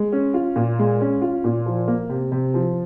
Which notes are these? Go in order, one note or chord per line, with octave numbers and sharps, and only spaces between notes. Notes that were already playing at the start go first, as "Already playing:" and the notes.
Already playing: G#3
C#4
F4
A#2
G#3
C#4
F4
A#2
F3
A#3
C3
C3
F3